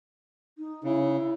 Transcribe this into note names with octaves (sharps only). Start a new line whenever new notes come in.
D#4
C#3 E4